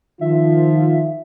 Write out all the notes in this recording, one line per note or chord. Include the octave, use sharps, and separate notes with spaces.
D#3 F3 F4 E5